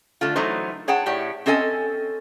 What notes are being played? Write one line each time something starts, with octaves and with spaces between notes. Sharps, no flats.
D3 A3 F4
E3 F#3 A3 D#4 C5
G#4 C#5 F#5 G5 A5
A2 G4 C#5 D5
C4 C#4 A4 D#5 G#5